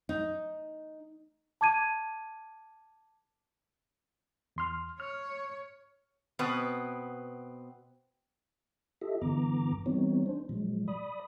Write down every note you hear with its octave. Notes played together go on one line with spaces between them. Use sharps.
D#4
A5 D6 G#6 D#7
E2 C6 F6
C#5 F6
B2 B3 C4 B4
F4 G4 A4 D#5 E5
G2 D3 E3 B3 A#5 D6
E3 G3 B3 C4 D#4 C#5
C#4 D4 C5
A#2 F3 F#3 G#3
D5 B5 D#6